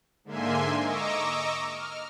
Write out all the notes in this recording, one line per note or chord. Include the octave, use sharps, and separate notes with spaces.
G#2 D3 A#3 E5 G#5 C6
D#5 A#5 C#6 D6 E6
F6